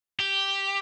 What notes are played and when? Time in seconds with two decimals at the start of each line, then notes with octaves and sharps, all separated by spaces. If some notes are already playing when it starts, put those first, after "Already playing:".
0.19 G4